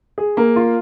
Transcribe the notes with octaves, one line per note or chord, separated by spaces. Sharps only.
G#4
A#3
F4